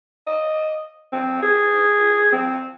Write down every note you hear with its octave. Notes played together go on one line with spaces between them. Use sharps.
D#5
C4
G#4
C4